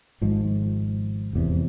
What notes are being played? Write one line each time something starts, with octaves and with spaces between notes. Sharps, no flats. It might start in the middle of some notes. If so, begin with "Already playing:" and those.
G#1 G#2 F3
F1 E2 C3